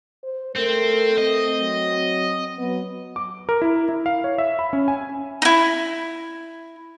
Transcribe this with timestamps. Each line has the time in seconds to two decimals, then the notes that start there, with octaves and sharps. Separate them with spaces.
0.23 C5
0.56 A3 C4 A#4
1.18 C4 D#5
1.60 F#3
2.58 F#3 B3
3.16 D6
3.49 A#4
3.62 E4
3.89 E4
4.06 F5
4.24 C#5
4.38 E5
4.59 B5
4.73 C#4
4.88 G#5
5.42 D#4 E4